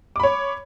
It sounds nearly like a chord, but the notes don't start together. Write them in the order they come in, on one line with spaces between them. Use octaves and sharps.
D6 B5 C#5